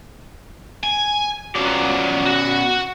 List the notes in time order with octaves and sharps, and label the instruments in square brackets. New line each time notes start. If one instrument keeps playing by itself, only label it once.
[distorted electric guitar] G#5
[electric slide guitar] B2 C#4 D5 [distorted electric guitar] F3 F#3
[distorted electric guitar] F#4 F#5